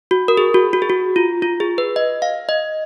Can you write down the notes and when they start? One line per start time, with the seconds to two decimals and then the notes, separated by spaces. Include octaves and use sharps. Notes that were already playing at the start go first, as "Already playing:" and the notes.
0.11 F#4
0.28 A#4
0.37 G#4
0.54 F#4
0.73 F#4
0.82 G#4
0.90 F#4
1.16 F4
1.42 F4
1.60 G#4
1.78 B4
1.96 D#5
2.22 F5
2.49 D#5